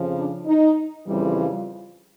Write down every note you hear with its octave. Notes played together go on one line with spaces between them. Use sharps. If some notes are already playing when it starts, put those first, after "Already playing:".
Already playing: F2 C#3 F3
D4
D#4
F2 C#3 E3 G3
F4